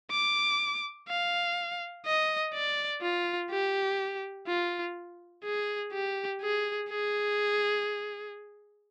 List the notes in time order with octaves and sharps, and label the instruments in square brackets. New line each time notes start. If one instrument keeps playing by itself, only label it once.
[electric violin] D6
F5
D#5
D5
F4
G4
F4
G#4
G4
G#4
G#4